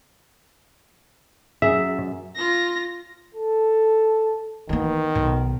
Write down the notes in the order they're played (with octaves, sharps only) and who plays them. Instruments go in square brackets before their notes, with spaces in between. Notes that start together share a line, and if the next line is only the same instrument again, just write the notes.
[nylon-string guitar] F#2 G#4 [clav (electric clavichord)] E5
[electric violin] F4 A#6
[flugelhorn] A4
[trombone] D#3 [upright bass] E3 B3
[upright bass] B1